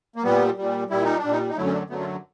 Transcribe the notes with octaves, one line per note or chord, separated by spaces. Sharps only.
A#3
A#2 G3 B3
A#2 G3
A#2 G3 E4
D#4
D4
A#2 G3
D#4
D#4
F#2 D3 F#3 A3 E4
C#4
D4
F#2 D3 F#3 A3 B3
F4